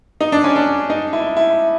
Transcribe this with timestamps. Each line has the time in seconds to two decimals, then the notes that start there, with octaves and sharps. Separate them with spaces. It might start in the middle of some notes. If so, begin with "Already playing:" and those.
0.21 D#4
0.32 D4
0.44 C#4
0.56 D4
0.90 D#4
1.13 E4
1.37 E4